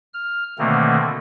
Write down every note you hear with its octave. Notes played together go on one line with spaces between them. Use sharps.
F6
B2 D3 D#3 A3 A#3 C4